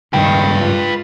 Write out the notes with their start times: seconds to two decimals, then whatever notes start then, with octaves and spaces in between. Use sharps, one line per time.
0.14 C#2 G2 D#3 B4 G5
0.55 G#2 F4